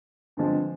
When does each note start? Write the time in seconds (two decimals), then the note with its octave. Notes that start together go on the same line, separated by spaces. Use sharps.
0.37 G2 D3 F3 G#3 C4